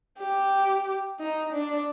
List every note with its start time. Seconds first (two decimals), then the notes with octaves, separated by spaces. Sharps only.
0.19 G4
1.19 D#4
1.54 D4